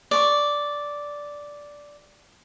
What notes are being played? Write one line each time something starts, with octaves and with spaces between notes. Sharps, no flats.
D5 C#6